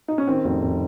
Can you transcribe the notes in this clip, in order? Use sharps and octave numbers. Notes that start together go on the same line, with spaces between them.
D#4
C#4
D#3 C4
F1
F1